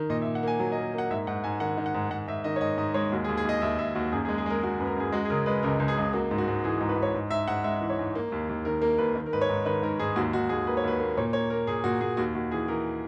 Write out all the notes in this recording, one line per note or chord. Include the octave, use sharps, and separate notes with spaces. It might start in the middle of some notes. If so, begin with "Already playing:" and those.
Already playing: D#3
A#2 D#5
E5
A#2
F#5
A#3 G#5
F#3
D#5
A#3
A#3 F#5
G#2 E5
G#2 F#5
G#2 G#5
D#3 F#5
D#3
F#5
G#2
G#2 F#5
G#2 E5
D#3 D#5
C#5
G#2 D#5
G#2 D#5
G#3 C#5
D#2 F#4
G#4
D#2
G#4
D#2 D#5
D#2 E5
D#2 E5
D#2 F#4
F#2 G#4
G#4
G#3
G#4
G#3 A#4
G#3 F#4
F#2 B4
A#4
F#2 G#4
G#3 F#4
G#4
C#3 A#4
G#3 B4
C#2 A#4
C#2
G#4
C#2
A#3 F#4
G#2
F#4
G#2
E3 G#4
G#2
B4
G#2
C#5
G#2
G#2 E5
G#2 F#5
G#3 E5
E3
C#5
G#2
A#3
D#2
D#2
D#3 A#4
A#3 A#4
D#2 B4
D#3
A#4
G#2 B4
C#5
G#2
D#3 B4
G#2 A#4
G#2 G#4
D#2 F#4
D#2 F#4
D#2 G#4
A#3 B4
C#5
D#2 B4
A#3
A#2 C#5
A#3 C#5
A#3 A#4
A#2 G#4
A#2 F#4
A#2 G#4
D#2 F#4
D#2 F#4
E3 G#4
E3 A#4